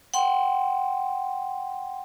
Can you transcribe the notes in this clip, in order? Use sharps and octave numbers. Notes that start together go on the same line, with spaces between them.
F#5 G5 C6